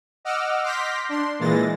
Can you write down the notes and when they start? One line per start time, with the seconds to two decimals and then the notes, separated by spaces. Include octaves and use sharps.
0.25 D#5 F#5 D6 E6 F6
0.63 C6 D6 F6 G6 A#6 B6
1.09 D4 C6
1.39 A#2 E3 G#3 A6 A#6